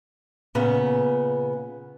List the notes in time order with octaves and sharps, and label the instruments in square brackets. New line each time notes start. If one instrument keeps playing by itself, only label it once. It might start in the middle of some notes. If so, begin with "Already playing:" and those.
[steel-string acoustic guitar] A#2 C#3 B3